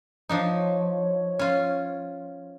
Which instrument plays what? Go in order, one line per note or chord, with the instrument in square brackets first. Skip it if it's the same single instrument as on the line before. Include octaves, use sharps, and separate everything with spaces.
[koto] F3 D4 D#4 [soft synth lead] C#5
[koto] C#4 F4